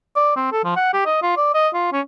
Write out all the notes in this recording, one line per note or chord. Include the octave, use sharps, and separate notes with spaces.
D5
C4
A4
F3
F#5
G4
D#5
F4
D5
D#5
F4
C#4